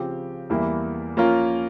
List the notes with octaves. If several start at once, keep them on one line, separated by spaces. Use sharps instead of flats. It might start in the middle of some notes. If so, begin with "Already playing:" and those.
Already playing: C#3 F3 C4 G4
E2 E3 G3 A#3 E4
F3 A#3 C#4 F4 A#4